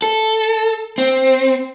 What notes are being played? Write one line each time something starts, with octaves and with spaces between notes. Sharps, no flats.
A4
C4